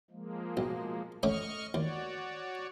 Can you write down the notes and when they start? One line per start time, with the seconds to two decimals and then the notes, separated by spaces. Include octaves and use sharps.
0.11 F3 G#3 A#3
0.57 B1
1.23 D3 A3 C#4 D#5 C#6 F6
1.74 D#2 F#4 C#5 D5